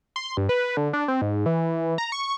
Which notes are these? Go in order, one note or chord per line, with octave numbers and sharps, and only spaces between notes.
C6
G2
B4
D3
D4
C4
G#2
E3
A#5
C#6